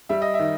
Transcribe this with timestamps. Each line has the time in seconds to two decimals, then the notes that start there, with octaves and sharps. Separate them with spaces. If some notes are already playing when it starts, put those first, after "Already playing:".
0.09 G3 E5
0.22 D#5
0.34 E5
0.39 D#3